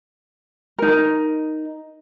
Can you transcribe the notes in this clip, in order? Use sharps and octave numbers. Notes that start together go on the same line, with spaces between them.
D#4 A#4